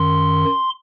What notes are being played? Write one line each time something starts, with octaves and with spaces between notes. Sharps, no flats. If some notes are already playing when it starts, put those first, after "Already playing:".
Already playing: F#2 D#3 C6